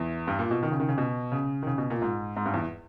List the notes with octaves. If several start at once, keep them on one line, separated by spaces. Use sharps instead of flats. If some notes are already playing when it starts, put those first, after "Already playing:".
Already playing: E2
G2
A#2
B2
D#3
C#3
D#3
C#3
B2
C#3
D#3
C#3
B2
A#2
G#2
G#2
G2
E2